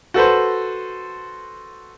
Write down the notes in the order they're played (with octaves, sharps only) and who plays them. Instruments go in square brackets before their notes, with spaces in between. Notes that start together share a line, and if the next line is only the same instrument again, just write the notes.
[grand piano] F#4 A4 B4 C5